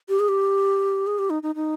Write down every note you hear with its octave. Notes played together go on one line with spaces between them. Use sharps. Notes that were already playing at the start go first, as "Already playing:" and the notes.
G4
G#4
G4
G#4
G4
D#4
D#4
D#4